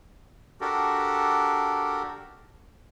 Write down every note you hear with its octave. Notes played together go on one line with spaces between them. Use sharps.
D4 F#4 G4 A4 A#4